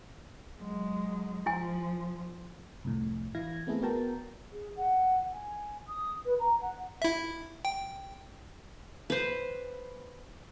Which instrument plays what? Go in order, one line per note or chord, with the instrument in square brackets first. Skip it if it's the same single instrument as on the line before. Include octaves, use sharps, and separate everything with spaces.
[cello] F#3 G#3
[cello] F3 [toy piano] E4 G#5
[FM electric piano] C2 F2 A2
E3 E4 F5 G#6 A#6
A3 B3 C4 E4 G#4 A4
B3 F#4 A#4 G5 A5 A#5
[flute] G#4
F#5
G#5
D#6
B4
A#5
F#5
[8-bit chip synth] E4 E5
G5
[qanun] B4 C5